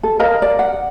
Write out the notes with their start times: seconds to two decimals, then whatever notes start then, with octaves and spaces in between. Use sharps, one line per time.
0.03 A4
0.19 A#4 D#5 F5 A#5
0.42 D5
0.59 F#5